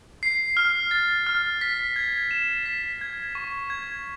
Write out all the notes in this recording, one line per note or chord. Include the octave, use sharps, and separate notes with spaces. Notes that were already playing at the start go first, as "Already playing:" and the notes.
C7
F6
A6
F6
B6
G#6
E7
B6
G#6
C#6
G#6